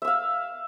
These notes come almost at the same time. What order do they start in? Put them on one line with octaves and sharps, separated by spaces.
E5 E6 F5